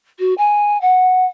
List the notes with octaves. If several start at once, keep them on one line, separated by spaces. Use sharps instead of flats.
F#4
G#5
F#5